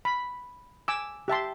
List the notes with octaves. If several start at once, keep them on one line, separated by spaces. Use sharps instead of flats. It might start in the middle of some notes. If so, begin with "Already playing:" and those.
B5
G#5 D6 E6
G4 E5 A5 C6